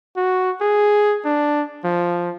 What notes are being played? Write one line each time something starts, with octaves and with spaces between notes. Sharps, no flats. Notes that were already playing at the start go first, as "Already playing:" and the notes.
F#4
G#4
D4
F3